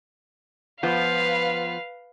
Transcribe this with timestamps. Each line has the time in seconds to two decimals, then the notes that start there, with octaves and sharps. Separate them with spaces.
0.83 F3 B3 F4 B4 F5